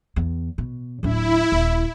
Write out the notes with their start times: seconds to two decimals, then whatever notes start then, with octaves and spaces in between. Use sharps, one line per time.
0.16 E2
0.58 B2
1.03 D1 D4 E4
1.52 D#1